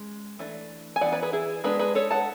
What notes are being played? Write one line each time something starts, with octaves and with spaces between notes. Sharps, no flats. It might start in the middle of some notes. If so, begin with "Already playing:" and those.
Already playing: G#3 C#4
E3 A3 D4
G#5
E3 B3 D4 D5 F#5
B4 D5
G#4 B4
E4 G#4
G#3 B3 D4 G#4 B4
G#4 B4
A4 C#5
F#5 A5